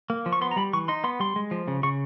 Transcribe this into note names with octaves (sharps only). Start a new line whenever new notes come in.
A#3
F3
C#6
B3 C6
A#5
G3 B5
E3 C#6
D#4 C6
B3 C6
G3 C6
G#3
F3
C#3
C#3 C#6